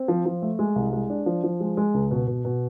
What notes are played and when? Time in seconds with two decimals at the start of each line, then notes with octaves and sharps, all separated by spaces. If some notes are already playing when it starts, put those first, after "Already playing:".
Already playing: C4
0.08 F3
0.26 F3
0.42 A3
0.59 G#3
0.76 C2
0.93 G#3
1.10 D4
1.26 F3
1.44 F3
1.60 G#3
1.77 G#3
1.94 C#2
2.11 B2
2.27 B2
2.45 B2